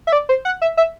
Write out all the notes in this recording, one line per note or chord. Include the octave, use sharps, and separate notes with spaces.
E5
D5
C5
F#5
E5
E5